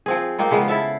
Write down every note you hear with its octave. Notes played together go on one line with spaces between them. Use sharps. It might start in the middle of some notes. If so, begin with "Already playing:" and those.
F3 C4 G#4
A#3 C4 D#4 F4
C#3 F3 G#3 B3
E4 A4 E5 F5